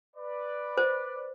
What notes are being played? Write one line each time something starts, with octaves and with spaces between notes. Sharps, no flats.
B4 D5
C5